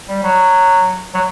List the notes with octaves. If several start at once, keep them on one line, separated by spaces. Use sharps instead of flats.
G3
F#3
F#3